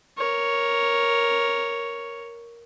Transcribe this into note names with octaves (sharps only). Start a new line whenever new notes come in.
A#4 C#5